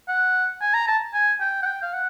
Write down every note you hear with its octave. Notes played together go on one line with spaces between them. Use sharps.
F#5
G#5
A#5
A5
G#5
G5
F#5
G5
F5
F#5